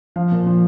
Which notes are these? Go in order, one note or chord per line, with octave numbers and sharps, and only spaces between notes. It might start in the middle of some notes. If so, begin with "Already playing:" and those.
F3 F5
A#2
F3